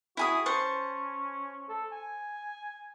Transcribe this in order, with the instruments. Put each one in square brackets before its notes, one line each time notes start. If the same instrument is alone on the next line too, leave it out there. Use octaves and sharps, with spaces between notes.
[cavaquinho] E4 G#4 D#6 [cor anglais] F#4
[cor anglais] C#4 [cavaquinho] C5 A5 C#6
[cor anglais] A4
G#5